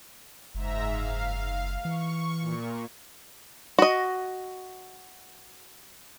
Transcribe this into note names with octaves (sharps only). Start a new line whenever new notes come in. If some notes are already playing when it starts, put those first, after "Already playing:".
F#1 G#2 E5 A#5
F5
E3 C#6
A#2
F#4 D#5